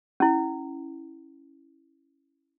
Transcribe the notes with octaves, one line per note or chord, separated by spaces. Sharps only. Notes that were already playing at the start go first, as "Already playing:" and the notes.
C#4 E4